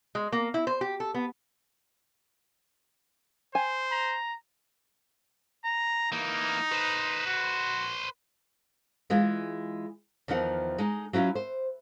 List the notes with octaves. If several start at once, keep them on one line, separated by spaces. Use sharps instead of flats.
G#3
A#3
E4
C5
G4
A4
B3
C5 G#5
A#5
A#5
E3 A#3 D#4
B4 C5
F#4
E3 G#3 F4 G#4
E2 D#3 F3 D#4 F#5
G#3 D#4
F#3 C#4 E4 F4
C5